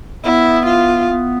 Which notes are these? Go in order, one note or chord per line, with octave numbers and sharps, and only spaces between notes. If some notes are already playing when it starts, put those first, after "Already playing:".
B3 E4
F4
B3